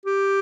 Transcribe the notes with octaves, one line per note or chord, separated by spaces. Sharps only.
G4